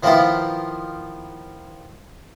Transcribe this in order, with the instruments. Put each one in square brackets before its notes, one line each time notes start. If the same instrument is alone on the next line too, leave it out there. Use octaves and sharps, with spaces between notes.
[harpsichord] D#3 F3 A#3 B3 E4 F4